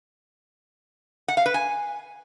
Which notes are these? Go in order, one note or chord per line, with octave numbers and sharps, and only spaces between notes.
F#5
F5
B4
G#5